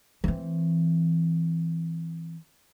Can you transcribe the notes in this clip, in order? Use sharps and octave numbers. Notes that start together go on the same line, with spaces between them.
E3 C4